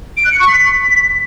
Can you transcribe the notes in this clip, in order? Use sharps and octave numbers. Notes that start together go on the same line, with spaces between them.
D7
F#6
C#7
C#6
B6